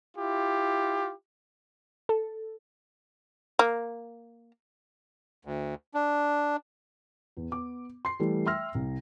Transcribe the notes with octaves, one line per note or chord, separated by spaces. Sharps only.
E4 F4 G4
A4
A#3
D2
D4
E2
B3 D6
C6 C7
E3 G3 A3
E5 G5 C6 E6 F6 A#6
C2